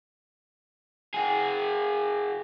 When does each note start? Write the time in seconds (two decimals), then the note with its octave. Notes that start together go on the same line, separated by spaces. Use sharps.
1.14 F#4 G#4